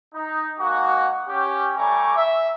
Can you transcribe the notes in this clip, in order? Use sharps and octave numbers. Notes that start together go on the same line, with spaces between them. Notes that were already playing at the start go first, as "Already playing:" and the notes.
D#4
G#3 A#3 D#4 F#4
C#4 G4
G3 A3 G#5 A#5 C#6 D6
E5